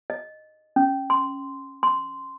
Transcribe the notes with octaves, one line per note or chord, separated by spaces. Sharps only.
D#5
C#4
C6
C6